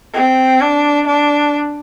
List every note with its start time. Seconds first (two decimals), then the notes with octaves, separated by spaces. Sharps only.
0.14 C4
0.61 D4
1.07 D4